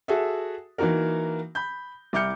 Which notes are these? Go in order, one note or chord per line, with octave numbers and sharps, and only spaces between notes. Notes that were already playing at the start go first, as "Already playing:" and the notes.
F#4 G#4 A4 E5
E3 A#3 D#4 F#4 A#4
B5 G6
C2 E4 D6 F6 G6 C#7